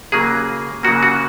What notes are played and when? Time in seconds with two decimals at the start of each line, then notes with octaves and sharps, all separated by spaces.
0.12 C#3 F#3 A#3 G#4
0.83 C#3 F#3 A#3 F#4
1.03 F#4